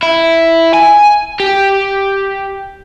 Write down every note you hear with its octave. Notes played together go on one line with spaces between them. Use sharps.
E4
G#5
G4